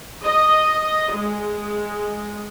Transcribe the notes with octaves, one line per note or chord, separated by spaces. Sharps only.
D#5
G#3